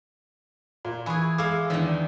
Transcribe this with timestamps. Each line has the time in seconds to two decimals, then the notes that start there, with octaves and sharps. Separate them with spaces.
0.85 A#2
1.06 E3 G#4 G#5 B5 C#6
1.38 G#3 E4 G#4 F5 D6
1.70 E2 D3 D#3